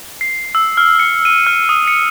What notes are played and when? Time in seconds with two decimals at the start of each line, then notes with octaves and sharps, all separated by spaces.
0.21 C7
0.55 E6
0.77 F6
0.99 C#7
1.25 D#7
1.47 F6
1.69 D#6
1.88 C#7